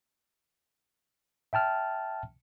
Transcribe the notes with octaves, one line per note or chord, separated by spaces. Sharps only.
E5 G5 A5 F6